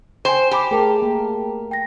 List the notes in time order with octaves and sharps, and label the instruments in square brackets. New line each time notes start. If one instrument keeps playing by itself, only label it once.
[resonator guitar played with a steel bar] C5 [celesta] G5 G#5
[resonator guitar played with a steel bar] G4 [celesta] G#5 B5 D6
[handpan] A3 A#4 [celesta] G#4 G5 A5
[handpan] A#3
[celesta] G5 A#6